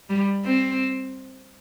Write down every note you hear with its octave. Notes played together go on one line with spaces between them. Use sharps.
G3
C4